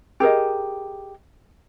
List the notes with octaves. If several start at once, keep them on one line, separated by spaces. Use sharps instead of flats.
G4 G#4 A#4 D#5